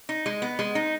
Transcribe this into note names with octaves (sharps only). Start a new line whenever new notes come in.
D#4
G#3
B3
G#3
D#4